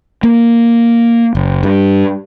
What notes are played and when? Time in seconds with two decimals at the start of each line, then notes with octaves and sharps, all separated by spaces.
0.23 A#3
1.35 F#1
1.63 G2